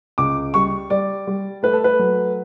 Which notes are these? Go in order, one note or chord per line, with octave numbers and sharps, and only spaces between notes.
C#2 D6
G3 C#6
G3 D5
G3
A3 B4
A4
B4
F#3